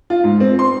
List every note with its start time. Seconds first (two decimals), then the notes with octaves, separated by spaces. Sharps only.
0.10 F4
0.24 G#2
0.40 C4
0.59 C6